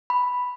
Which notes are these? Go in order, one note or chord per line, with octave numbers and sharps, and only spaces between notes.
B5